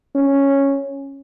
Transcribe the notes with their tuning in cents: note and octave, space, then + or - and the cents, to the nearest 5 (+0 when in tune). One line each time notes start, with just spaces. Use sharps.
C#4 -5